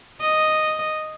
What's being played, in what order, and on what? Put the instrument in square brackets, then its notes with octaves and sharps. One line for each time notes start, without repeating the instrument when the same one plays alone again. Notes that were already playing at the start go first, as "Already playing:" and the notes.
[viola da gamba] D#5